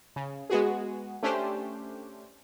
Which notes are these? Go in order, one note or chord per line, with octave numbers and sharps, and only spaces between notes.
C#3
G#3 B3 F#4 G#4
A3 C#4 D4 G4 C5